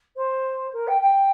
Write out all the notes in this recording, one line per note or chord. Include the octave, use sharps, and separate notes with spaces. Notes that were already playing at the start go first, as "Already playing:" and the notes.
C5
A#4
G5
G5